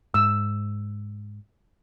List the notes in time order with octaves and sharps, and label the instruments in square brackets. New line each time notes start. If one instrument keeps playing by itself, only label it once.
[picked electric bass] G#2 [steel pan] E6